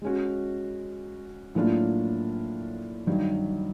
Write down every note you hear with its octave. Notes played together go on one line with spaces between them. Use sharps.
G#3 C#4 F#4
A2 F#3 A#3 D4 F4
G2 D#3 F#3